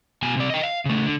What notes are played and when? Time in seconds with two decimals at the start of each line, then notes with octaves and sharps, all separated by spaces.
0.23 B2 G#5
0.37 C3 D5
0.50 D#5 G5
0.63 F5
0.85 C#3 A3
1.06 D3